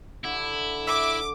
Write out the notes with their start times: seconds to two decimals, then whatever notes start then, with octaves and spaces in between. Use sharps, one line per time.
0.24 D3 E4
0.88 E5 D6